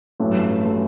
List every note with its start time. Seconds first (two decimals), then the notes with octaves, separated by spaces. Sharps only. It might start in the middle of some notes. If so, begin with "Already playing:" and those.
0.20 A1 G2 F#3 A3
0.65 F#3 A3